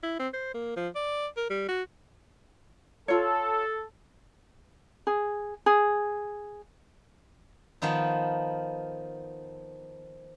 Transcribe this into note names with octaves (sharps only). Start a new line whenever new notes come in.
E4
C4
C5
A#3
F3
D5
A#4
G3
F#4
F4 A4 C#5
G#4
G#4
D#3 F3 B3 D#4